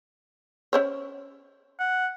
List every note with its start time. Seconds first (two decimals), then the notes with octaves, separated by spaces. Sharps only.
0.73 C#4 C5 C#5
1.79 F#5